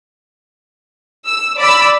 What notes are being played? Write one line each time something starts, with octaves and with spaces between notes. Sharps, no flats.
E6
D5 B5 E6